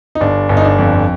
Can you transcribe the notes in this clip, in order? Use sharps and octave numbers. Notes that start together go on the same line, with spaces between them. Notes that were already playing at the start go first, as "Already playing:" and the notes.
D#4
G1 D4
G1
D#4
D4
F2